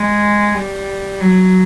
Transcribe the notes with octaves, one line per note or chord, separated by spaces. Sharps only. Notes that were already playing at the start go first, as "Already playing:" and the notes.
Already playing: G#3
G3
F#3